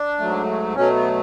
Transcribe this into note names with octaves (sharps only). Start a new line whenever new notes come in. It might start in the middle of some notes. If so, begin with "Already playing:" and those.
Already playing: D4
G#2 F#3 A3
B2 F#3 A3 C#4
B3